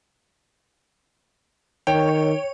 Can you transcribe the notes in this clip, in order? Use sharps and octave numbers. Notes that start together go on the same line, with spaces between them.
D#3 C#5 G5